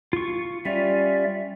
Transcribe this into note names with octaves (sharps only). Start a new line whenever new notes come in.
F4 C#6
G3 C#4 F4 D5 E5